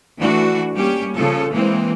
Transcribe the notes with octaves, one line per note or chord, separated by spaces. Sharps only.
E3 A3 D4 F#4
G3 A#3 C#4 G4
C#3 F3 A4
E3 G#3 A#3 C4